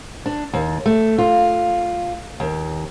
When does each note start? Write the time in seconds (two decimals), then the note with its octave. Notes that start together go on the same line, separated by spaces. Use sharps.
0.26 D4
0.53 D#2
0.86 A3
1.18 F4
2.40 D#2